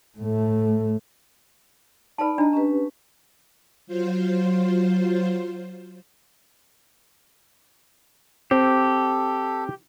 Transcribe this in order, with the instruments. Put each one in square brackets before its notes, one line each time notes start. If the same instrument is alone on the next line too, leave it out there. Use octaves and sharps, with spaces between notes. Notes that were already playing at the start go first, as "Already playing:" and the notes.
[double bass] A2 A3
[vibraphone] D#4 D5 B5 [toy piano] B4 A5
[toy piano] D4 [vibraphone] D#5 A#5
[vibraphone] C#4 G4 B4
[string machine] F#3 F4 C5
[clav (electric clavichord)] C4 [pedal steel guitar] G4 [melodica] A4